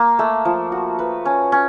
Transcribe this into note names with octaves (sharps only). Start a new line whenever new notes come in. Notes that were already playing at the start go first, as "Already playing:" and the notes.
Already playing: A#3
A3
F3
F#4
B4
C#4
C#4